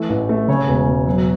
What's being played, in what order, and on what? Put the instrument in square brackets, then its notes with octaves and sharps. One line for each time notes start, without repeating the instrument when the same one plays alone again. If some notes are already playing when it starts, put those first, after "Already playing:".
Already playing: [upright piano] E3 A3
A1
A3
C#3 C#5
E1
E1
F#3